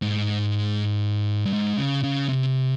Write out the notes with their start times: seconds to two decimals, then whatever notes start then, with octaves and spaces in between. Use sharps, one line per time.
0.02 G#2
1.45 G2
1.53 G#2
1.78 C#3
2.03 C#3
2.29 C3